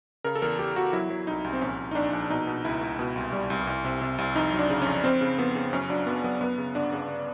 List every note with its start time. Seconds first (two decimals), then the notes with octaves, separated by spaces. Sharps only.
0.24 C#3 A#4
0.36 A4
0.42 E2 A#4
0.59 E2 G4
0.76 E2 F#4
0.93 F#3 E4
1.10 F#3
1.27 C2 D#4
1.44 C2
1.53 C4
1.61 A#1 C#4
1.78 A#1
1.91 D#4
1.95 A#1 D4
2.13 A#1
2.30 B2 D#4
2.47 B2
2.65 C#2 E4
2.81 C#2
2.99 B2
3.16 C2
3.33 G3
3.50 C2
3.67 C2
3.84 C3
4.01 C3
4.18 C2
4.35 F2 D#4
4.53 F#3
4.59 D4
4.70 C#3
4.82 F2 C#4
5.04 F2 C4
5.21 C#3
5.38 F2 B3
5.55 C#3
5.73 F#2 C#4
5.89 F#3 D4
6.07 F#2 B3
6.24 F#2 B3
6.41 F#2 B3
6.58 C#3
6.75 G1 D4
6.92 C#3